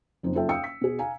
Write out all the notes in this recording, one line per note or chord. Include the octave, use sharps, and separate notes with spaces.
F#1 F2 D#4 C5
F#1 F4 A4 E5 G5
F5 G5 D#6 E6 C#7
B6
B2 G#4
F5 G#5 A#5